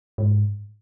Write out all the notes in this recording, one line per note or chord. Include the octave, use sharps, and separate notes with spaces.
G#2